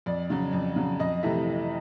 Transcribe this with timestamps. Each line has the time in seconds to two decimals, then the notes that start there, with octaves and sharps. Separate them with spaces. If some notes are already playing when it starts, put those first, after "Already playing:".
0.06 F2 D5
0.30 C#3 F#3
0.53 F2
0.76 C#3 F#3
1.00 F2 D#5
1.22 C3 E3 A3 E5